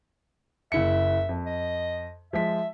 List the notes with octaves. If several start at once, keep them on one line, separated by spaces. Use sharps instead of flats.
F#1 E4 E5 C#7
F2
D#5
F3 G#3 E5 B6